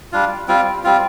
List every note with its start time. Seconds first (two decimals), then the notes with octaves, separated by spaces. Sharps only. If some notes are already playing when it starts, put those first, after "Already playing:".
0.12 G3 D4 F4
0.48 G3 C4 F4
0.84 G3 C4 F4